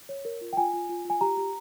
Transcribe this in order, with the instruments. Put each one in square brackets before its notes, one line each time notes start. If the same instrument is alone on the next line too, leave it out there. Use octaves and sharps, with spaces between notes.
[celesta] C#5
A#4
F4
G5
F4 G#5
F4
F4
F4 G#5
G4 A#5
G4